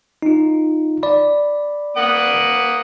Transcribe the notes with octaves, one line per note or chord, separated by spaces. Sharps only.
D#4 F4
D5 B5
A#3 F#5 D#6